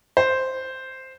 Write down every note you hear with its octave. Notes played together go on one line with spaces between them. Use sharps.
C5